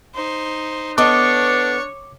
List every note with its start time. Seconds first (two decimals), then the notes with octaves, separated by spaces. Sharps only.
0.15 D#4 C5
0.98 B3 D4 A4 C#5 D#5 C#6 D6